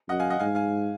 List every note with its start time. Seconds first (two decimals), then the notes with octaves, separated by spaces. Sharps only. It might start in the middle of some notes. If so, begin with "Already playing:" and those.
0.09 F#2 D#5 F#5
0.19 F5 G#5
0.30 D#5 F#5
0.39 G#2 F5 G#5
0.55 F5 G#5